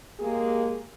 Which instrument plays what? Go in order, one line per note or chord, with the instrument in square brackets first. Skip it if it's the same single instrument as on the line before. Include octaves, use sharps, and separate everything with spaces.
[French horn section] G#3 A#3 G4 G#4